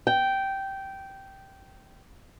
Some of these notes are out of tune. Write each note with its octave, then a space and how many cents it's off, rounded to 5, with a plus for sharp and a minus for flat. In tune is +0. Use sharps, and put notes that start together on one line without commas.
G5 -10